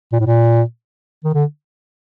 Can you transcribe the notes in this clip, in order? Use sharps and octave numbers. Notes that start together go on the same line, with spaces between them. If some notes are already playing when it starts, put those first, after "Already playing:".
A#2
A2
A#2
D#3
D3